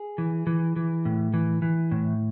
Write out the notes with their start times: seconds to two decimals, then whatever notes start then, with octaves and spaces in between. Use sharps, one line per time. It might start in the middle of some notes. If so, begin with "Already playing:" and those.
Already playing: G#4
0.18 E3
0.47 E3
0.76 E3
1.05 A2
1.34 E3
1.62 E3
1.91 A2